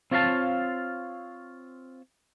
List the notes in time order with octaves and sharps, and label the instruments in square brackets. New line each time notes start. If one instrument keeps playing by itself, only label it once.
[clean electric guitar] C4 F4 C#5 D5 F5 A5